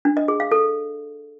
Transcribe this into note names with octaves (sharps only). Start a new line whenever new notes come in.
D4
D#5
G#4
F5
A4